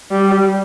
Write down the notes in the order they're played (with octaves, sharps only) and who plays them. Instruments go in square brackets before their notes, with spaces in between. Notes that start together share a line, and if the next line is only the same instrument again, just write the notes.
[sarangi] G3